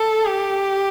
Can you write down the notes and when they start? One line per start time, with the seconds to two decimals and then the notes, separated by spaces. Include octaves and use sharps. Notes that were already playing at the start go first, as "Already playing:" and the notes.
Already playing: A4
0.25 G4